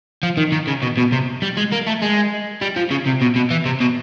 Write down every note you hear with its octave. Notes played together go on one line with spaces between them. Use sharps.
F3
D#3
D#3
C#3
B2
B2
C3
G3
G#3
A#3
A3
G#3
G3
F3
C#3
C3
B2
B2
E3
C3
B2